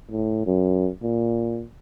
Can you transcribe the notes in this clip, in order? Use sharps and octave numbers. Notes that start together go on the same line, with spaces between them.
A2
F#2
A#2